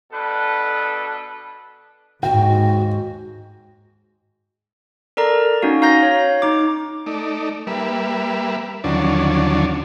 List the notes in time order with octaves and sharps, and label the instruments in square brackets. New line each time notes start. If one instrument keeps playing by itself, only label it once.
[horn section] B2 D4 A4 B4
[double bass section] D#2 G#2 [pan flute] F#4 [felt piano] G5
[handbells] A4 A#4 D5 A#5
C#4 D#4 F#4 F5
F5 A#5 G6 A#6
C#5
D#4 D6
[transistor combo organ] A3 D#4 D5
G3 A#3 B4 E5
D#2 D3 F3 F#3 C#4 D4